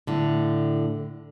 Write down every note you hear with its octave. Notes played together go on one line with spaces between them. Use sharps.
A2 D3